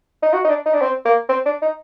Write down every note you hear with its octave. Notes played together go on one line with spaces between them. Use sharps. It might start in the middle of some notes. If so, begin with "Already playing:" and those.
D#4
F#4
D#4
D4
D#4
D4
C4
A#3
C4
D4
D#4